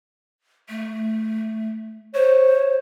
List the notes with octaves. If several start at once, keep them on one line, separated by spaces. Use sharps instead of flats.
A3
C5 C#5